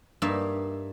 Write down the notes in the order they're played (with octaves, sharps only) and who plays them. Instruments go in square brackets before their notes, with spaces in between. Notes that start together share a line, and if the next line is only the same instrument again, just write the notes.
[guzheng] G2 A#3 D#4 E5